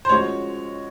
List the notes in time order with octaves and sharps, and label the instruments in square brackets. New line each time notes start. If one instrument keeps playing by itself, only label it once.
[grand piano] C5
[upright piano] F3 G#3 C#4 F#4 [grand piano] C#5